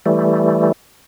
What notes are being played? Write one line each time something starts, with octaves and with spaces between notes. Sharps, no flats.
E3 G3 A3